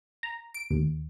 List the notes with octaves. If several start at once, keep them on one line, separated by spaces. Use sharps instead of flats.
A#5
D7
D#2